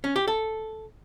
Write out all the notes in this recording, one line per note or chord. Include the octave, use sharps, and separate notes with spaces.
C#4
G4
A4